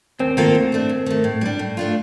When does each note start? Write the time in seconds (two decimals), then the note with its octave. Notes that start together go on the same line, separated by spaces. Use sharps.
0.19 D#2 C4
0.37 D#3 A#3 F4 A4
0.55 D2
0.72 D3 A3 D4
0.89 D#2
1.06 D#3 A3
1.24 A2
1.41 G3 D4
1.59 A2
1.77 A3 D4 F4